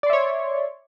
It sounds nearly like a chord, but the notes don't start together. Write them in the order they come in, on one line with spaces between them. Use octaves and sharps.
D5 C6 E5 C#5